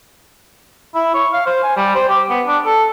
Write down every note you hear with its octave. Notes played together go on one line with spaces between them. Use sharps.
E4
C#5
F5
C5
G#5
G3
C5
G4
B3
D4
A4